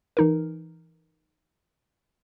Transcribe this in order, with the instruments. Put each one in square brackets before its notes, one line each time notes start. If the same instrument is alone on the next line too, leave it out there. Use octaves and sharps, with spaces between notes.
[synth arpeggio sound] E3 D#4 A#4